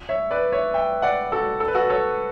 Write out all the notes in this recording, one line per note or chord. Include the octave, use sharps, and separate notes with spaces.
C#5 E5
B4 D5
C#5 E5
E5 G5
D5 F#5
F#4 A4
A4
B4
F#4 A4
A4 C#5